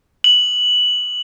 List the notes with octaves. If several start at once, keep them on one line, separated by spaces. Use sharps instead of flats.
F#7